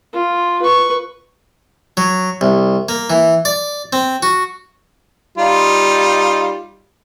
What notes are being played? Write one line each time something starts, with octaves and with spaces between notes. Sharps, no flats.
F4
B4 C#6
F#3
C2
A#3
E3
D5
C4
F#4
G3 D#4 F4